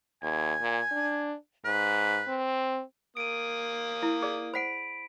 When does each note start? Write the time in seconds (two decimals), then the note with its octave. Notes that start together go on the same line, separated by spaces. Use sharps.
0.23 D#2 G#5
0.61 A#2
0.92 D4
1.65 G#2 B4
2.28 C4
3.17 A#3 D#6 D7 D#7
4.02 E4
4.22 G#4 D5
4.54 C5 F#5 B5 B6 D7